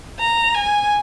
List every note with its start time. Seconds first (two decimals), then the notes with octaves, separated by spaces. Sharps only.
0.20 A#5
0.55 G#5